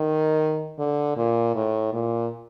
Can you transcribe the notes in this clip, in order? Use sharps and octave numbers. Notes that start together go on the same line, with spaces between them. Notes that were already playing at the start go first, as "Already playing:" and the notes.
Already playing: D#3
D3
A#2
A2
A#2